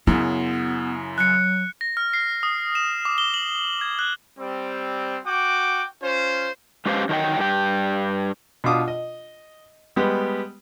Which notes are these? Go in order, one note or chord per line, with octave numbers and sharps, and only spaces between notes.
F#2 C#3 B3 E4
F#3 F#6 C#7
A#6
F6
C7
D#6
E7
D6
G7
F#7
G#6
F#6
G3 C4
F#4 G5 D6
C#4 F4 C5
G#3 C#4 G4 B4 C5 F5
D#3 F#3 G#4 D#5 G5
G2 G4 G5
B2 D4 F4 D6 D#6
D#5
G3 G#3 B3 G4